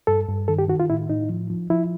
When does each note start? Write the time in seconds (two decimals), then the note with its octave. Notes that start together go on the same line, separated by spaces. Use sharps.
0.07 G2 A4
0.28 G2
0.48 D#3 A4
0.59 G4
0.69 D#3 F#4
0.80 F4
0.90 A2 E4
1.10 A2 D#4
1.29 F3
1.50 F3
1.70 F3 E4